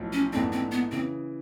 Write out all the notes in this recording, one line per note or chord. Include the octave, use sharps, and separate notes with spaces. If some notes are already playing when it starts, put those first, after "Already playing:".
Already playing: B1 A2 F3
C#4
A#1 G#2 E3 A3 C4 D4
C4
B3
C#3 E3 C4